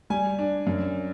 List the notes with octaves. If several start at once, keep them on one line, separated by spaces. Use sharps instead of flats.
G3 G#5
D4
F#2